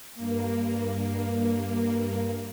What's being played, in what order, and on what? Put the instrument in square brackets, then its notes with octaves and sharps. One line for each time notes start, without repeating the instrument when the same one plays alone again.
[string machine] G2 A#3